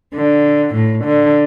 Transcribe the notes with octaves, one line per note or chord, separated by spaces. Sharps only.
D3
A2
D3